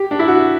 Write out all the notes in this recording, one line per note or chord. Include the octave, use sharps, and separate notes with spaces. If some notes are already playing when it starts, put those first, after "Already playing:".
Already playing: G4
D4
E4
F#4